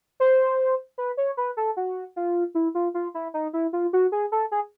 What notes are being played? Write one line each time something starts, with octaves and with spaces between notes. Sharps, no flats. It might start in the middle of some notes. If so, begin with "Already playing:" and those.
C5
B4
C#5
B4
A4
F#4
F4
E4
F4
F4
E4
D#4
E4
F4
F#4
G#4
A4
G#4